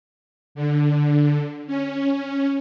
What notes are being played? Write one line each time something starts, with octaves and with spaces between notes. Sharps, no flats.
D3
C#4